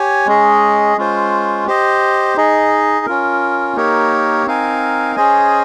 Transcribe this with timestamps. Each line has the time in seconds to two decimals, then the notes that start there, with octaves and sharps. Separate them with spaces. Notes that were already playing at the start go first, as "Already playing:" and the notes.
Already playing: G4 C#5 G#5
0.26 G#3 C#4 G#4 D#5
0.97 G#3 C#4 F4 C5
1.67 G4 C5 D#5
2.37 D#4 G#4 D#5
3.06 C#4 F4 A#4
3.76 A#3 D#4 G4 A#4 C#5
4.46 C4 D#4 A#4 F5 G#5
5.16 C#4 G#4 C5 D#5 G#5